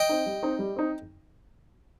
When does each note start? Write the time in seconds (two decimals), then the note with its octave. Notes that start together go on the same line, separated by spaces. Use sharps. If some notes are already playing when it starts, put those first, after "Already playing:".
Already playing: D#5 G5
0.09 C4 D#4
0.26 G3
0.43 C4 D#4
0.59 G3
0.76 C4 D#4